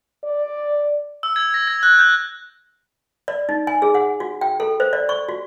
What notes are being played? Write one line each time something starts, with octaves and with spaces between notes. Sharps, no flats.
D5
E6
G#6
A#6
G#6
F#6
G6
D5
D#4
G#5
G#4
F#5
F#4
G5
A4
C5
D5
C#6
F#4